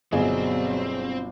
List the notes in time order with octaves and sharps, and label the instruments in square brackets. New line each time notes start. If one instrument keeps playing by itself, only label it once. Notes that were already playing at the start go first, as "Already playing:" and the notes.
[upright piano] G1 [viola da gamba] B2 F#3 G3 [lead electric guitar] C4 [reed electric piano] G#4 D#5